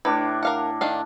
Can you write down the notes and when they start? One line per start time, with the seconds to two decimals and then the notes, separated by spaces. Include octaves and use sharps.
0.05 A2 D4 B4 D6
0.43 A#4 F5 F#5
0.81 D#3 D4 F5